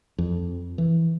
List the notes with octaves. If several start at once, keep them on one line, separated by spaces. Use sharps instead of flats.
F2
E3